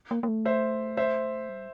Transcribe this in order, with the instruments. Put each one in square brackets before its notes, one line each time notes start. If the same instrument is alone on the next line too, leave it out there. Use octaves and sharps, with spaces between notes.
[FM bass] A#3
A#3
A3
[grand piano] C5 E5
C5 E5
[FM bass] G3